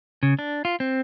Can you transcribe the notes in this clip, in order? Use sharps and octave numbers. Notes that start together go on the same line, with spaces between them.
C#3
D4
F4
C4